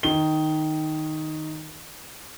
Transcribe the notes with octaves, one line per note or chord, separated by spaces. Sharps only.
D#3 G7